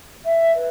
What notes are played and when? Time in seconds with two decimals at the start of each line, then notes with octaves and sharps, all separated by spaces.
0.25 E5
0.55 B4